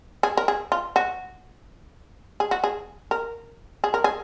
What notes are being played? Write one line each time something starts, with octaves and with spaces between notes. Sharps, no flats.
G#4
A#4
G#4
F4
F#4
G#4
F#4
G#4
A#4
G#4
A#4
G#4